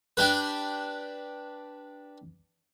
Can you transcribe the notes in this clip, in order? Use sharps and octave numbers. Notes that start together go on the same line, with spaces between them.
D4 G4 B4